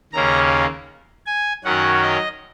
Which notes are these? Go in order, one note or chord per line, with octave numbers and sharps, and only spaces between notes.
D#2 C#3 A#3 C#4 A#5
G#5
F#2 D#3 F#3 C#4 F#5
D#5